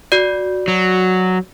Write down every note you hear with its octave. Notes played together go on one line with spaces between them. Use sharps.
F#4 D5
F#3